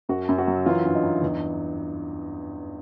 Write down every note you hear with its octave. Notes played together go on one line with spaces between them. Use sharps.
F#2 F#4
F#2
F#4
F#3
E3 F4
G2
D#4
G2
E2